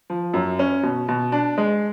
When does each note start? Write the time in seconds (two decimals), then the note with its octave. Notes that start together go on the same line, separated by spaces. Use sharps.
0.10 F3
0.34 F#2
0.59 C#4
0.83 B2
1.09 B2
1.32 D4
1.58 G#3